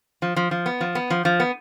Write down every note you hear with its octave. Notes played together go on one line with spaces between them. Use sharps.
F3
F3
F3
B3
F3
B3
F3
F3
B3